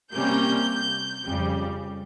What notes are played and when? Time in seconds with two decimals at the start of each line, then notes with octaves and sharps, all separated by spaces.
0.14 C3 G3 A#3 C#4 G6
1.25 F2 C#3 G3